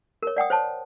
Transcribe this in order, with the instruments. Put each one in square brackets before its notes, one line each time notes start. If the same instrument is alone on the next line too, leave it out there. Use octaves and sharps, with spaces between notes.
[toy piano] A#4 C#5
D5 F#5 G5 D#6
C5 C#5 A5